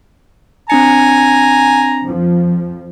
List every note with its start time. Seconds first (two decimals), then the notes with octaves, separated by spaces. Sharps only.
0.70 C4 D4 G#5 A#5 C#7
2.04 F2 F3